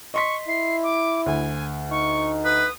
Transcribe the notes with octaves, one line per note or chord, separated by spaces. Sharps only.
D#5 C6 C#6 B6
E4 C7
D6
D2 G#5
D#4 C#6
B4 D#6